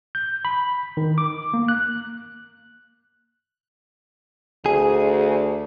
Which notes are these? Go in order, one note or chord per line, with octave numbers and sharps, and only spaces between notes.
G6
B5
D#3
D6
A#3
F#6
D2 G#4